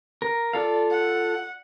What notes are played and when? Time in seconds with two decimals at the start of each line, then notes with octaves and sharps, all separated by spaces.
0.22 A#4
0.53 F4 A4 D5 F5
0.90 F#5